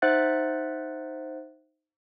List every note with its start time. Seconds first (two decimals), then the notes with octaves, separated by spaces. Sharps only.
0.02 D#4 C5 E5 F#5 F#6 A6